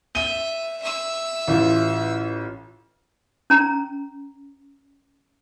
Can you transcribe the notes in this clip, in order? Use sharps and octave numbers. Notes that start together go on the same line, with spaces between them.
E5 D#7 G7
E5 E6
A1 E3 F4
C#4 A#5